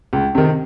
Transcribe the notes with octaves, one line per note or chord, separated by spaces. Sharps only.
C#2
C3 D#3